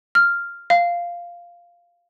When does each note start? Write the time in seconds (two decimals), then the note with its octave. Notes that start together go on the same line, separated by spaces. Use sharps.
0.15 F6
0.70 F5